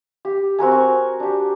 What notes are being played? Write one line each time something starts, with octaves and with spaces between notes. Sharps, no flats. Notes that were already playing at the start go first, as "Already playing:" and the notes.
G4
C4 F#4 A#4 G#5
C#6
D4 G4